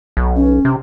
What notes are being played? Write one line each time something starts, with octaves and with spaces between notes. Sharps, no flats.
B1
C#4
C3